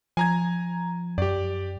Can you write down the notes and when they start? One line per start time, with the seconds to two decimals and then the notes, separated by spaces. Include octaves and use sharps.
0.17 F3 G#5 A#5 G#6
1.18 F#2 G4 D5